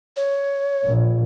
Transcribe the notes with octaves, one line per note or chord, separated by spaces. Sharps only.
C#5
A#1